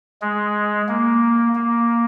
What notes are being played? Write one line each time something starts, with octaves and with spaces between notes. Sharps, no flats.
G#3
A#3
A#3